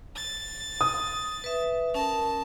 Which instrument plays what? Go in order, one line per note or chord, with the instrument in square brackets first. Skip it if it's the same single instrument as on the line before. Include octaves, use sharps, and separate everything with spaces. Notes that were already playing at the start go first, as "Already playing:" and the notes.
[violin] A6
[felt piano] D#6
[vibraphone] B4 E5
[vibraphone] C#4 A#4 [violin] A5